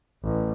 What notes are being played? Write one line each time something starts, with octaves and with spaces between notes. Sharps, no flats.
A1